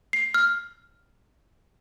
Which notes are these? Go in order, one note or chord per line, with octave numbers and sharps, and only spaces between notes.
C7
F6